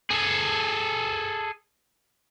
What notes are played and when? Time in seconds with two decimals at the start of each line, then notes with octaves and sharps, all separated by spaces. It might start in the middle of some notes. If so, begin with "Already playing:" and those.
0.11 G#4 A4